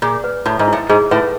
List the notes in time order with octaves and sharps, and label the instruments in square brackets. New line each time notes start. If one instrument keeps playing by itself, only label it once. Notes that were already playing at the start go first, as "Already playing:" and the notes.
[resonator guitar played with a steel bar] A#2 [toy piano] G#4
[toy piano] B4
[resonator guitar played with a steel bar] A2 [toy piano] E4
[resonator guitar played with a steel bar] G#2
[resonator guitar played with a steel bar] A2 [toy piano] E4
[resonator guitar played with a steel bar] G#2 [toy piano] G#4
[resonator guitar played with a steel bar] A2 [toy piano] B4